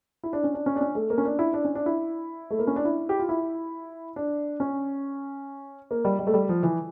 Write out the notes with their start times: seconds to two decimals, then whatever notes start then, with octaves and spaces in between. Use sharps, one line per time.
0.23 E4
0.33 D4
0.44 C#4
0.54 D4
0.66 C#4
0.76 D4
0.81 C#4
0.95 A3
1.10 A#3
1.18 C#4
1.25 D4
1.39 E4
1.54 D4
1.65 C#4
1.75 D4
1.86 E4
2.51 A3
2.59 A#3
2.67 C#4
2.76 D4
2.85 E4
3.09 G4
3.19 F4
3.29 E4
4.16 D4
4.60 C#4
5.91 A#3
6.05 G3
6.19 G3
6.27 A3
6.34 G3
6.49 F3
6.63 E3